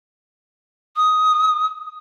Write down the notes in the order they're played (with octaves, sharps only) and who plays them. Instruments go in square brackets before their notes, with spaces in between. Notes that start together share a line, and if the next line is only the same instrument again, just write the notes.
[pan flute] D#6